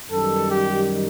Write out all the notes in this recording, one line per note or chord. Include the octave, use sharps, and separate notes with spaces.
F#2 D#3 G3 A4
G4